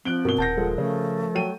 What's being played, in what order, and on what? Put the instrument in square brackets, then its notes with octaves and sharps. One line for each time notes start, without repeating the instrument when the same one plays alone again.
[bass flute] F3 [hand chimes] C4 [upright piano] F#6 D7 G7
[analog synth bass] G2 [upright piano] B2 G7 [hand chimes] A#4
[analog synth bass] D#1 [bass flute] F#5 [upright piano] A5 G6 A#6
[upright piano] F3 G#3 A4
[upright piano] C#3 [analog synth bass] F3 [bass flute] A3
[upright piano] F#3 G5 D#7